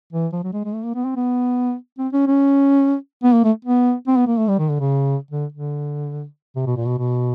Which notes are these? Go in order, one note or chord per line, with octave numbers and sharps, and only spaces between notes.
E3
F3
F#3
G#3
G#3
A3
A#3
B3
C4
B3
C4
C#4
C#4
B3
A#3
A3
B3
C4
B3
A#3
A3
G3
D#3
D3
C#3
D3
D3
C3
B2
A#2
B2
B2